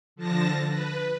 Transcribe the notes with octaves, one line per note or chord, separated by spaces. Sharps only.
D3 F3 A5 A#6
B4